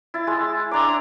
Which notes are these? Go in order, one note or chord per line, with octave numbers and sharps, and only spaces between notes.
E4 A6
G#3
D4 A#5 D6